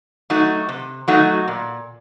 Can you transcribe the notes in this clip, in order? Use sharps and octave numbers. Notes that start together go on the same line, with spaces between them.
F#3 A3 D#4 F#4
C3
F#3 A3 D#4 F#4
A#2